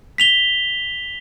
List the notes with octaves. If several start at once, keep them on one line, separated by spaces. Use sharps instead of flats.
B6 F7 G7